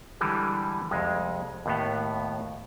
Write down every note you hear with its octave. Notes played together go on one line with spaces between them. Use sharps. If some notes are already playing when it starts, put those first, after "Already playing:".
D3 E3 G3 G#3
C2 F2 G#3
D#2 A2 B3